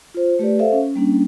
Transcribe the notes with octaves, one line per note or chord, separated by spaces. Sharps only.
F4 C5
A3 G4 B4 D5
A4 C5 E5 F5
C#4
G3 A#3 C#4 D4